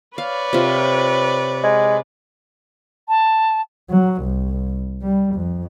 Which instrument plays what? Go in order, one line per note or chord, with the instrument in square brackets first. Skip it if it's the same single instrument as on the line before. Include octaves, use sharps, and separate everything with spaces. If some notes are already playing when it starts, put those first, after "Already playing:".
[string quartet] B4 C#5 D5 [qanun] F5
[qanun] C3 F4
[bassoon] G#3
[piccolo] A5
[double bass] F#3
C2
G3
F2